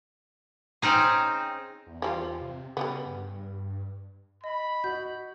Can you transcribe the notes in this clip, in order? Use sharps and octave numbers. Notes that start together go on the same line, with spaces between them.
C4 C#4 D#4 G#4
E2
F3 G3 F4
E2
C3
C#3 G3 G#3 B3
G2
D#5 B5
F#4 D#5 G6